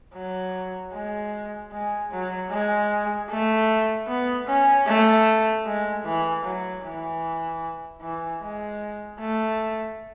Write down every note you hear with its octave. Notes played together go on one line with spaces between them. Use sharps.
F#3
G#3
G#3
F#3
G#3
A3
B3
C#4
A3
G#3
E3
F#3
E3
E3
G#3
A3